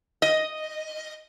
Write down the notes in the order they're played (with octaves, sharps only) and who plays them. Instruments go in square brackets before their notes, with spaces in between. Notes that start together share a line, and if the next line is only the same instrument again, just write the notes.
[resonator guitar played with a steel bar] D#5